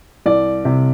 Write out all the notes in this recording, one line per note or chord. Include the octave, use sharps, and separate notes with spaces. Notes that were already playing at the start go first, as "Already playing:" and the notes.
C2 D5
C3